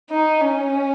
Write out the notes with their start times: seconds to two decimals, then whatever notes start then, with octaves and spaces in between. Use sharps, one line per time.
0.10 D#4
0.42 C#4